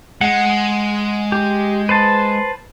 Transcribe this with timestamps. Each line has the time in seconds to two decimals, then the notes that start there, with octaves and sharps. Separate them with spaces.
0.21 G#3 F#5
1.32 G4
1.89 B4 C5 A5